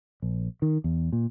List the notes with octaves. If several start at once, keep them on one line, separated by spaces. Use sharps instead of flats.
A#1
D#3
E2
A#2